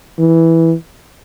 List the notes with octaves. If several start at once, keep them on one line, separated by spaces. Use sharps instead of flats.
E3